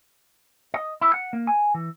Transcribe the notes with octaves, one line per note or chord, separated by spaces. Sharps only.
D#5
E4
F#5
A#3
G#5
E3